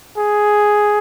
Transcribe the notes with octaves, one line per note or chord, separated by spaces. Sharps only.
G#4